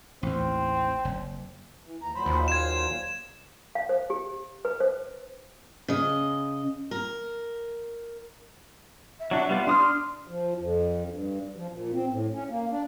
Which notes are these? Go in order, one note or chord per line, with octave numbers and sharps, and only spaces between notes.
A1 D#2 C4
F#1
E3
D#2 A#5
A#2 F#3 C5 B5
D#2
F5 G#6 E7
F5
C5
G4
B4
C5
C#3 D#5
A#4
E5
F#3 D4 E5
G3 B3 F4
D4 C6 D#6 F6
F3
F2
G2
F3
A#2
C4
A2
C#4
A#3
D4